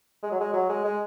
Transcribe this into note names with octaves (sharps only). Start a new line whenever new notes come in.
G#3
F#3
G#3
F#3
G#3
G#3